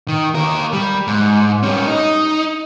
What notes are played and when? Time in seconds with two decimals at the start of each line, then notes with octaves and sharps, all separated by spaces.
0.08 D#3
0.35 D#2 A#4
0.73 G3
1.07 G#2
1.63 G3 C#4
1.87 D#4